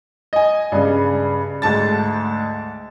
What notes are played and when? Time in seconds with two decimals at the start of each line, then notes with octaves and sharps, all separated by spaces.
0.33 D#5 G#5
0.72 G2 C#3
1.62 D2 G#2 A5 A6